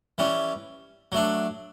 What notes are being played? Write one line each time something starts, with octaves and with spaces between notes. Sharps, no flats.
E3 G3 C#4
F#3 A3 D4